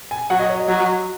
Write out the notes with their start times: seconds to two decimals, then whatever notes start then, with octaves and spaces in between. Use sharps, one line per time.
0.11 G#5
0.30 F#3 F#5
0.39 D#5
0.49 C#5
0.59 D#5
0.68 F#3